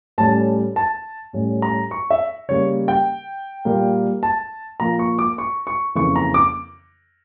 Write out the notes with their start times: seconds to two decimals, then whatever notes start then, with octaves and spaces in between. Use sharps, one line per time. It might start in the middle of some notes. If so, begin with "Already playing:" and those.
0.18 A2 G3 C#4 A5
0.76 A5
1.33 A2 G3 C#4
1.62 A#5
1.91 C#6
2.10 E5
2.49 C#3 G3 A#3 C#5
2.88 G5
3.65 A#2 G3 A#3
4.23 A5
4.80 A#2 F3 A#3 A#5
4.99 C#6
5.19 D6
5.38 C#6
5.67 C#6
5.95 F2 C#3 E3 A#3 C#6
6.16 A#5
6.34 D6